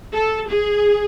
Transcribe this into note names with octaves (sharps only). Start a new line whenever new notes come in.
A4
G#4